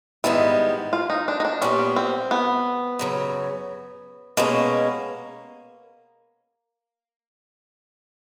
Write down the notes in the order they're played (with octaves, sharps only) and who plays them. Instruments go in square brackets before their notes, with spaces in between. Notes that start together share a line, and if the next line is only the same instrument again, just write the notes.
[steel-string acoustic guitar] G#2 D#3 G3 B3 [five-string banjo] E4
[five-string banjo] F4
D#4
D4
D#4
D4
[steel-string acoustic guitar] A#2 G3 B3 [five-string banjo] C#4
[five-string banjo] C4
B3
[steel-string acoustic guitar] F#2 C#3 F#3
[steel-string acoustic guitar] B2 G#3 C#4 [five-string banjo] A#3